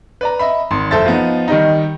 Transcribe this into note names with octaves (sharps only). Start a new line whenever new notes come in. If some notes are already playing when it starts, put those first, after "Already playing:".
B4 D5 A#5
D#5 E5 B5
G#1 C6
F#1 A4 C5 E5 A6
F3 B3 D#4
D#3 G3 D#4